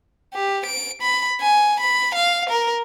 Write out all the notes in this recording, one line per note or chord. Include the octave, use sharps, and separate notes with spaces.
G4
D7
B5
G#5
B5
F5
A#4